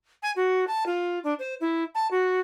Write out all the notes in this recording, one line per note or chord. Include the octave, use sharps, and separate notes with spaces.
G#5
F#4
A5
F4
D4
C5
E4
A5
F#4